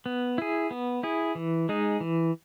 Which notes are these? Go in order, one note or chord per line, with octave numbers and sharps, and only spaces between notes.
B3
E4 G#4
B3
E4 G#4
E3
G#3 D#4 G#4
E3